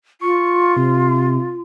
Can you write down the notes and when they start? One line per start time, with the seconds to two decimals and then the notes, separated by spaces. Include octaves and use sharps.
0.21 F4 C#6
0.76 C3